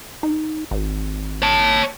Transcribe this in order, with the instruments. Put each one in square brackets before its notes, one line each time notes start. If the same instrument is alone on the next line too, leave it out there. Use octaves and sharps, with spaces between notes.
[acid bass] D#4
G#1
[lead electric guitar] C#5 A5